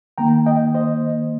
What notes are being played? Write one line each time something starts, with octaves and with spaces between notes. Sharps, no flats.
D#3 A#3 G5 A#5
D#5 G5
C5 D#5